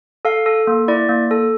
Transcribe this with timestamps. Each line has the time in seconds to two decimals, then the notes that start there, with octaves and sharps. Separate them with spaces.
0.25 A4 F5
0.46 A4
0.67 A#3
0.88 E4 D5
1.09 A#3
1.31 A4